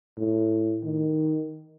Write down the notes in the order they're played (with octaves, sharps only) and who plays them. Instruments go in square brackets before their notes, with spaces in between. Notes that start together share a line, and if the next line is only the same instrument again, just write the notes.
[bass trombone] A2
D#3